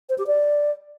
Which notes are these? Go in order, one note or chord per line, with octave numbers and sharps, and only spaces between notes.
C5
G4
D5